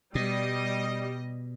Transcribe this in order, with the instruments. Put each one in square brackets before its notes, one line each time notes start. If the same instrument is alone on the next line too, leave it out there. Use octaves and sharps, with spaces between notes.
[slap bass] B2 [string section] G3 [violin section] D#5